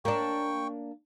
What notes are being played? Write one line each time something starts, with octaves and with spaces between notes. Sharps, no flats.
A#3 D4 G5 C#6